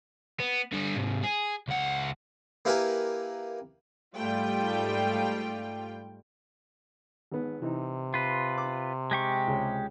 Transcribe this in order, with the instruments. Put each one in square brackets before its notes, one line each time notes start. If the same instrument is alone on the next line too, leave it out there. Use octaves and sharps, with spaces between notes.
[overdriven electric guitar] B3
D3 G3
G#2 C3
G#4
C#2 F#5
[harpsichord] A#3 E4 G4 A#4 B4 G#5
[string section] G#2 G3 A3 F4 G5
[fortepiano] G#1 B3
[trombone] C3 [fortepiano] E3 D#4
[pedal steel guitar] F4 B4
[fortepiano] D6
[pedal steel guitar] G#3 G4 C#6
[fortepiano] C#2